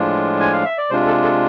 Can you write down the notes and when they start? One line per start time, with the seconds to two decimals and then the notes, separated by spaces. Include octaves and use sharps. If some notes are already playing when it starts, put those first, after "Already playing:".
Already playing: A2 F3 G#3 D4 F4
0.40 G#5
0.53 F5
0.65 E5
0.78 D5
0.90 C3 G#3 D4 F4 C5
1.07 A4
1.24 A4